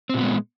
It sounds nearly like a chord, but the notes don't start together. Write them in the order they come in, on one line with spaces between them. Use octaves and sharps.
C4 A#2 B3 G#3